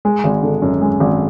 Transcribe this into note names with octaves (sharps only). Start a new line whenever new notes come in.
G#3
G#1
D3
F#2
G#3
G#1